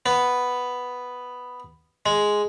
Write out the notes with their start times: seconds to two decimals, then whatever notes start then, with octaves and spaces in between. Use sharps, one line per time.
0.06 B3
2.06 G#3